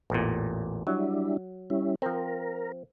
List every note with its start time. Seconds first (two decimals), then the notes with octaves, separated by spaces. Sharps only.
0.10 A1 E2 A#2
0.87 F#3 G3 D4 E4
1.70 G3 C#4 E4
2.02 F3 C4 A#4